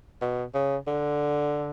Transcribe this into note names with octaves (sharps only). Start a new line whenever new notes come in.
B2
C#3
D3